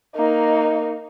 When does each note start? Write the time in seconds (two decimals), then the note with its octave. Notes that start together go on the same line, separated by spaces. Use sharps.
0.15 A#3 D#4